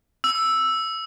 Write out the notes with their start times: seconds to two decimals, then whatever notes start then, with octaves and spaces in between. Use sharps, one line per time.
0.24 E6